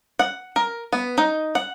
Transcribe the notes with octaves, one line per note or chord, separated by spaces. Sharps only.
F#5
A#4
B3
D#4
F#5